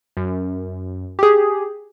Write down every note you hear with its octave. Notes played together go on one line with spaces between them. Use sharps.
F#2
G4 G#4